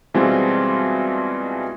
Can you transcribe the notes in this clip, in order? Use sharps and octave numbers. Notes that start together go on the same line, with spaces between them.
B2 E3 G3 G#3 C4 F4